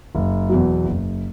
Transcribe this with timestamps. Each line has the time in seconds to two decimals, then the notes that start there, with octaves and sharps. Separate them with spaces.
0.15 F#1
0.50 E2 B2 F#3
0.84 F#1